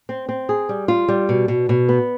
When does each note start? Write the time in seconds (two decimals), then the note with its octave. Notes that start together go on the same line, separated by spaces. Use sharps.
0.09 C4
0.29 C4
0.49 G#4
0.69 G3
0.88 F4
1.08 G3
1.29 B2
1.48 B2
1.69 B2
1.89 B3